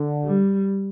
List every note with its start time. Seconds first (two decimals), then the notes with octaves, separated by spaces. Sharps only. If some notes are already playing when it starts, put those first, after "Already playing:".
Already playing: D3
0.25 G3